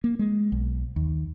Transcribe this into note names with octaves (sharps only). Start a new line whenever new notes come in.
A#3
G#3
B1
D#2